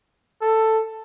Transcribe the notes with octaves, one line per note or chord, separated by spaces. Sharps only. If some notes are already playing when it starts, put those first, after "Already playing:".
A4